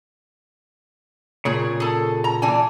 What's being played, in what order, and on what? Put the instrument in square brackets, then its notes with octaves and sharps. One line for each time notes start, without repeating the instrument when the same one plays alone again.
[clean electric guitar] A#2 C#3 [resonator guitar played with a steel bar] G#4 C#5
[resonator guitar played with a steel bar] G#4 A4
A#5
E3 D4 G#5